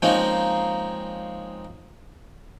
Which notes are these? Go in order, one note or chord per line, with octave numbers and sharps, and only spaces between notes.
F3 G#3 A#3 C4 C#4 D#4